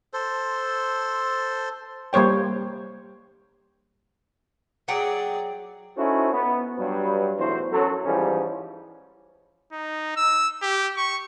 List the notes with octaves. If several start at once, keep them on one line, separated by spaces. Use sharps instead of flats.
A4 C5
G3 A#3 C5 C#5 G5
F#3 G#4 D5 F#5 G5
C#4 D#4 E4 F#4 A4 C5
B3
G2 F#3 B4
B1 E2 A2 F#4 C5
F#2 F#3 A4
G#2 E3 F3 G3 G#3 C#4
D#4
E6
G4
C#6